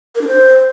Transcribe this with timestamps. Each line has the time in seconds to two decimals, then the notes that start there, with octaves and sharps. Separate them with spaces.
0.15 A#4
0.21 D4
0.28 C5